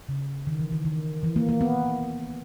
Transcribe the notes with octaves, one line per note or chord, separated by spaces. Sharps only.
C#3
D#3
E3
D#3
D#3
E3
A#3
A#3
B3